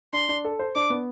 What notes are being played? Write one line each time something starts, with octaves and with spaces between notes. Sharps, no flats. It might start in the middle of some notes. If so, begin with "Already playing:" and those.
D4 C6
D4
A4
C5
D4 D6
B3